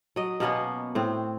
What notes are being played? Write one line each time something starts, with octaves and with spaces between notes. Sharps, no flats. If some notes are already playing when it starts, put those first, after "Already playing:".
F#3 D#5
B2 A#3 B3 C#4
A2 C4